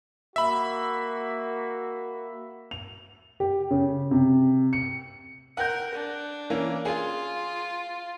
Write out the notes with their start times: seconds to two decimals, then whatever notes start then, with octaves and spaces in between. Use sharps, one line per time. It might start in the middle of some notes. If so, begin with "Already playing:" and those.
0.36 A#3 F#4 E5 B5
2.71 F7
3.40 G4
3.71 C#3
4.11 C3
4.73 C#7
5.57 A#4 F#5 G6
5.94 D4
6.50 E3 A#3 C#4
6.85 F4 G#4